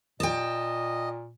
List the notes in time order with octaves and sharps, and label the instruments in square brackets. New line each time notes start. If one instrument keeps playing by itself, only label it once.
[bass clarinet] A#2 [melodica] D#5 [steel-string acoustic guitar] G5 A5